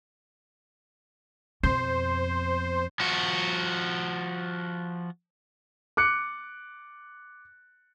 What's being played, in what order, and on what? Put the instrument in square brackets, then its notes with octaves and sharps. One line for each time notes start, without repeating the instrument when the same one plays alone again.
[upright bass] F2 B2 [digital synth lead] C5
[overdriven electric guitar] F3 F#4
[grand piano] D6 F#6 C#7